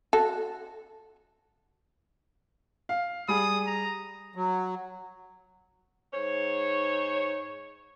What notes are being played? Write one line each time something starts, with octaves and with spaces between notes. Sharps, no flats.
F#4 A4
F5
G3 G#4 D#6
A#5
F#3
G#2 C5 C#5